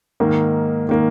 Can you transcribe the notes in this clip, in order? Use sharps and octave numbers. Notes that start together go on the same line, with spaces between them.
G#2 D#3 A#3
D#3 A#3